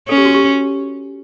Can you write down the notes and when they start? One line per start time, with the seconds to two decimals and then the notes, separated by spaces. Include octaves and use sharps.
0.09 C#4 A4
0.17 G4
0.25 F#4
0.35 G4